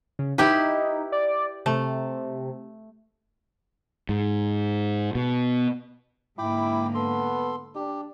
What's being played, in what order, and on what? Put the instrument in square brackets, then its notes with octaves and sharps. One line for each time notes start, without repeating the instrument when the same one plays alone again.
[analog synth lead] C#3
[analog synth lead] D#4 [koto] E4 G4 B4
[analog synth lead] D5
[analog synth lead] C3 [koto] A3
[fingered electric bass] G#2
B2
[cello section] G#2 D3 A#3 [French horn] E4 [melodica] G5 B5 D6
[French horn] B3 [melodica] A4 C6
[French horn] D4 [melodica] G4